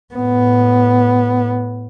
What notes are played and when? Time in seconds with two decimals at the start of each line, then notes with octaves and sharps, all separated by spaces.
0.14 A2 B3